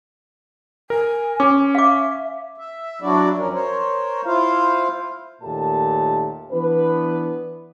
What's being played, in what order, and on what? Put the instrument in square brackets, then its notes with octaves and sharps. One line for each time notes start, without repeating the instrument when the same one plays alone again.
[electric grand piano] A#4 [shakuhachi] G#5
[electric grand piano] C#4 [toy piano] D6
[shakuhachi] E5 [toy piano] F5 D6
[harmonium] E5
F#3 D4 E4 F#4 D5
F2 C#4 A#4
A#4 C5 C#5
E4 F4 C5 F5
[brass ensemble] D#2 A#2 A3 A#3 G4 A5
E3 B3 D4 B4